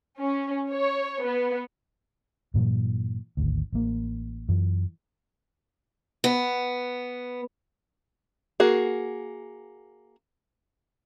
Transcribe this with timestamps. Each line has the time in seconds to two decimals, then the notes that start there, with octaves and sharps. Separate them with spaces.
0.19 C#4
0.71 C#5
1.23 B3
2.54 G2 A#2 E3 F#3
3.37 G#1 D2
3.73 A1 A#3
4.49 F#2 E3
6.24 B3
8.60 A#3 F#4 G#4